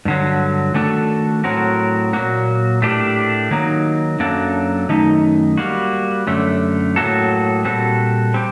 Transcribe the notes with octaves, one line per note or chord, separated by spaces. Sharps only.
G2 D3 F#3
D#3 A3 D4 F#4 A4
A2 F#3 C4 F#4 A#4
A#2 F#3 A#3 F#4
A2 A3 D4 G4 A#4
D#3 F#3 A#3 D#4
F#2 F#3 A#3 D4 A4
F#2 D#3 A3 D#4
G3 A#3 F#4
F#2 D3 A3
A2 F#3 A#3 F#4 A4
A#2 G3 C4 F#4 A4
G3 C4 G4